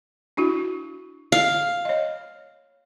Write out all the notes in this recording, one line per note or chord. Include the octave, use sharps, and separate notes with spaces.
D4 E4 F#4
F5
C#5 D#5